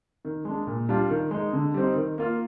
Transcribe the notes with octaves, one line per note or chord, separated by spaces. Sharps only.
D#3
G#3 D4
A#2
G3 D4 F4
D#3
G#3 D#4
D3
G3 C4 D#4
D#3
A#3 F4